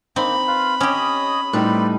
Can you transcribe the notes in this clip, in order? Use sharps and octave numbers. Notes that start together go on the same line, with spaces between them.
A#3 C4 D#4 B5
F4 B4 F5
C#4 G4 C#5 D#5 D#6
A2 G3 C4 D#4 B4 D5